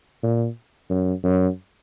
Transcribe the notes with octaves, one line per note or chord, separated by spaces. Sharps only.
A#2
F#2
F#2